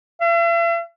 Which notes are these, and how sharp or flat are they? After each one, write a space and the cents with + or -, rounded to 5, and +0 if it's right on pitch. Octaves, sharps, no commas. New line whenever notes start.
E5 +45